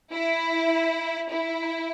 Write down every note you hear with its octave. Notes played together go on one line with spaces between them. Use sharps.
E4
E4